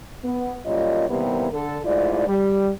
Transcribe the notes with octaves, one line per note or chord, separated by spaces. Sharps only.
B3
F#2 A#2 G3 F4 C#5 D#5
D#2 C3 E3 G3 A#3 B3
D3 A4
G#2 A3 E4 F4 D5
G3